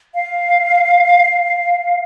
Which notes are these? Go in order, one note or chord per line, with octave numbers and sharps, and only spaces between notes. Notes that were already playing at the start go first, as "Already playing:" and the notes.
F5